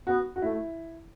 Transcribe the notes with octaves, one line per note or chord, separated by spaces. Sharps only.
B3 F#4
F#4
A3 E4